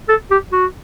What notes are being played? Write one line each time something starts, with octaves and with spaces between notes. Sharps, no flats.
A4
G4
F#4